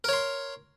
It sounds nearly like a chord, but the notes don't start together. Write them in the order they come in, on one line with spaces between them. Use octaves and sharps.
A#4 C#5 C6